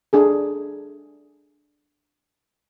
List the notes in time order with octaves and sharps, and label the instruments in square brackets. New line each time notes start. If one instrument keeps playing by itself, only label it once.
[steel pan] D4 G#4 A4